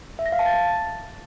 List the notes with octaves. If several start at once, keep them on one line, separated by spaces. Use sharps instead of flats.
E5
A#6
F5
A5
A6